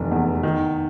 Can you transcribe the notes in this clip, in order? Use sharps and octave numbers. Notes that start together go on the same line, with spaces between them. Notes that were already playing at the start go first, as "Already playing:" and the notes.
Already playing: F1 C3 E3
E2
D#3